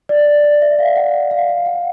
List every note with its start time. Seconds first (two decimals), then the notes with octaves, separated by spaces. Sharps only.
0.09 D5
0.27 D5
0.44 D5
0.62 E5
0.79 F5
0.96 F#5
1.31 F5
1.49 F5
1.66 F#5